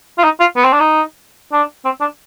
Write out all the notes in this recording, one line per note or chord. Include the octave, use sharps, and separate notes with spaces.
F4
D#4
F4
B3
C4
D4
D#4
D4
C4
D4